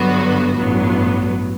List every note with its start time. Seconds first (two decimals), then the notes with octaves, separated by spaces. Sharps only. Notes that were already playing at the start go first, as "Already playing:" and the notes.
Already playing: G2 D3 F#3 B3 F#4
0.57 A1 G2 F#3 B3